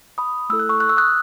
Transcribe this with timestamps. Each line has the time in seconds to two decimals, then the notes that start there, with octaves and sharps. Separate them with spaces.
0.18 B5 D#6
0.49 A3 E4 A4 E6
0.59 F#6
0.69 C#6 E6
0.80 F#6
0.89 E6
0.97 D#6 F#6